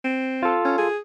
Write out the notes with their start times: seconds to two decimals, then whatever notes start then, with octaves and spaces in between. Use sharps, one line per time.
0.05 C4
0.43 F4 A4
0.65 C#4
0.78 G#4